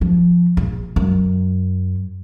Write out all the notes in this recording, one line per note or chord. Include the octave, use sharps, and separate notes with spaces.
F3
A#1
F#2